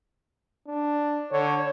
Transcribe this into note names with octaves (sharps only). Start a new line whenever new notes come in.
D4
D3 C#5